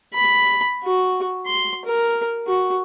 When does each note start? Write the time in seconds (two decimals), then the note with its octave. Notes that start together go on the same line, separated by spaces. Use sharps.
0.14 B5
0.84 F#4
1.46 C6
1.85 A#4
2.46 F#4